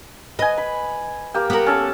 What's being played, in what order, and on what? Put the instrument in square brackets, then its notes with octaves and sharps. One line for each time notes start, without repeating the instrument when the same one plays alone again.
[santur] B4 G#5 [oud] D#5
[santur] B5
A#3 G4 G5
[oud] B3 A#4
[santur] C#4 A4 A5